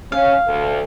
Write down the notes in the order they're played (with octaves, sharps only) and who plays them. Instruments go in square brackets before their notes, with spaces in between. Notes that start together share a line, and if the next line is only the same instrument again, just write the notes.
[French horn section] C#4 [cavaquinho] F5
[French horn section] D2 A4